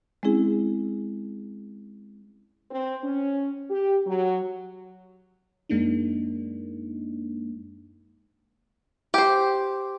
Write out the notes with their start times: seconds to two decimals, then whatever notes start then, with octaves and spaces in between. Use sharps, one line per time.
0.23 G#3 C4 C#4 E4 G#4
2.71 C4
3.04 C#4
3.70 G4
4.07 F#3
5.69 F#2 G#3 A#3 D4 D#4
9.14 G4 C5